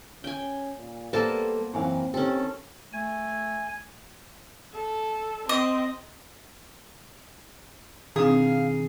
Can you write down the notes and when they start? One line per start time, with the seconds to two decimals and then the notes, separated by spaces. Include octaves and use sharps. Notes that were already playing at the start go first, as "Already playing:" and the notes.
0.24 C#4 G5 G#5
0.78 A#2
1.13 G3 A#3 B3 A4 C5 A5
1.73 F#2 E3 C4 F5
2.14 D#3 C4 C#4 G4 A4
2.93 A3 G#5
4.74 A4
5.49 C4 D#5
8.16 B2 D#3 C4 D4 G#4 F5